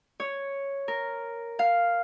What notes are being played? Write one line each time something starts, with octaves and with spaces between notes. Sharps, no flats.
C#5
A#4
F5